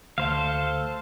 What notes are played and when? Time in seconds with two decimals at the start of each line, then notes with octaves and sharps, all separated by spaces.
0.18 D2 A4 C5 F5